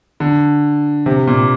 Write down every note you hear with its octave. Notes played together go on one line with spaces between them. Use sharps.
D3
C3
A#2